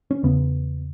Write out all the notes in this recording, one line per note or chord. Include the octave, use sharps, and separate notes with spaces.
C#4
E2 C#3 B3